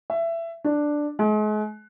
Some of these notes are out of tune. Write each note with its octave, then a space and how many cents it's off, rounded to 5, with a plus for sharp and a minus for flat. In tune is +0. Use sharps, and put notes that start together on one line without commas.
E5 +20
D4 +5
G#3 +40